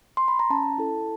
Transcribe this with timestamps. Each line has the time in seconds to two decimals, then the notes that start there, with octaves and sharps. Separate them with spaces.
0.17 C6
0.28 B5
0.39 A#5
0.50 C#4 A5
0.78 E4 A4